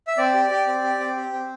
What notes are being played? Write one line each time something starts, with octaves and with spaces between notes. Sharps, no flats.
E5
C4 D5
G4
G4
C4
G4
C4
G4
C4